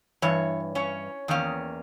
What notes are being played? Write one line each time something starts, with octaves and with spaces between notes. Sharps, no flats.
G2 E3 C#5
C#4 C#5
E2 D#3 A#3 C#4